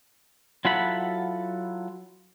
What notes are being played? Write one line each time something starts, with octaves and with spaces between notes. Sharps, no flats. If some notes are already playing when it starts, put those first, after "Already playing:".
F#3 E4 F4 A4 F#5 B5